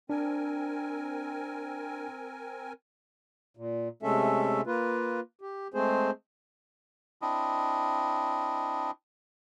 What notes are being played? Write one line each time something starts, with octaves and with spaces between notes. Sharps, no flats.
C4 D4 A#4 G#5
A#2
C3 G#3 A3 C#4 A4 E5
A#3 F4 B4
G4
G#3 A3 C4 G#4 C5
C4 D4 E4 D#5